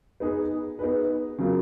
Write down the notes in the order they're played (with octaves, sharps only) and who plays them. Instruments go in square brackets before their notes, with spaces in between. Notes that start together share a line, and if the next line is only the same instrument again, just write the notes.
[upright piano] B3 D#4 G#4 B4
B3 D#4 G#4 B4
C#3 F#3 A#3 F4